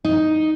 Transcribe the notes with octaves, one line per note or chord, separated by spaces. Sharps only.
D#4